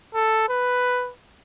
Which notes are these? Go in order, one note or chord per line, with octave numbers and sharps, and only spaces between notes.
A4
B4